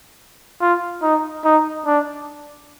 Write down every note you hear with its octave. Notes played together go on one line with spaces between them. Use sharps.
F4
D#4
D#4
D4